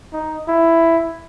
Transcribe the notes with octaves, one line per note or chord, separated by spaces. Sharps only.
D#4
E4